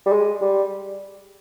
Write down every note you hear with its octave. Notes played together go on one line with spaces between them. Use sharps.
G3
G#3
G3